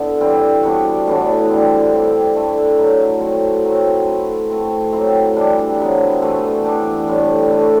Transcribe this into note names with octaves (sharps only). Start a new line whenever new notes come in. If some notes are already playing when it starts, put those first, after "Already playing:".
Already playing: D3 B3 E4
E3 G3 C4
G3 B3 D4 F#4
A2 E3 B3 D4
D3 G3 C4
G3 C4 E4 G4
D3 A3 E4 B4
F#3 A3 E4
F#3 C4 F#4 A4
F#3 C4 F#4 C5
A3 E4 B4
A3 C4 F#4
F#3 C4 E4 G4
E3 G3 D4
C3 F#3 B3
E3 A3 E4 B4
E3 B3 D4 G4
A2 G3 C4
A3 E4 B4